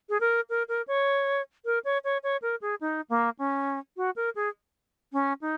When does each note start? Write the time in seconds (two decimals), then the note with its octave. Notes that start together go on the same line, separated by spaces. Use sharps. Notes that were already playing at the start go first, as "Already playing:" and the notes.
0.09 G#4
0.20 A#4
0.50 A#4
0.68 A#4
0.88 C#5
1.65 A#4
1.85 C#5
2.04 C#5
2.23 C#5
2.42 A#4
2.61 G#4
2.81 D#4
3.10 A#3
3.39 C#4
3.97 F#4
4.16 A#4
4.35 G#4
5.13 C#4
5.41 D#4